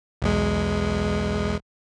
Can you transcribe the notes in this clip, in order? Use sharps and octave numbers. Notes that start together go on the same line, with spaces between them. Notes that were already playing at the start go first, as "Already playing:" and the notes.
B1 E2 G#3